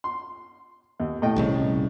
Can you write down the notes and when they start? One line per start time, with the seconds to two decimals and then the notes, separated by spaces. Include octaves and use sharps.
0.04 C6
1.00 D#2
1.22 A2 D#5 G5
1.36 D#1 C2 C#3